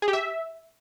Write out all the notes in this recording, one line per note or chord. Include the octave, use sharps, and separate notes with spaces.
G#4
G4
E5